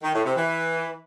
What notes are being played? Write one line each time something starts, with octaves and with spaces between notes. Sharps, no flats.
D#3
A2
C3
E3